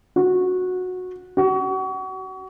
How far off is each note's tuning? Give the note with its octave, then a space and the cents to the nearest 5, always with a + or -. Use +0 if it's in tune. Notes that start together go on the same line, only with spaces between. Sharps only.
F#4 -15
F#4 +30